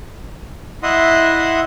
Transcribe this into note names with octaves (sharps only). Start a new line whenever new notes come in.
E4 D#5 E5 F#5 C6 D#6